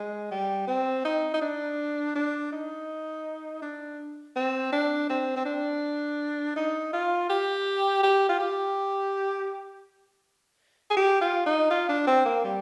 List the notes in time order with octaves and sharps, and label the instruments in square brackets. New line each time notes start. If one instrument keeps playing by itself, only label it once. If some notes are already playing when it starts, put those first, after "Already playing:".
Already playing: [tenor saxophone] G#3
G3
C4
D#4
D#4
D4
D4
D#4
D4
C4
D4
C4
C4
D4
D#4
F4
G4
G4
F4
G4
G#4
G4
F4
D#4
F4
D4
C4
A#3
G3